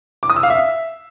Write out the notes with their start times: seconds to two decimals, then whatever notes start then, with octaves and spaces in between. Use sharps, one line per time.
0.23 D6
0.30 D#6
0.36 E6
0.43 F5
0.50 E5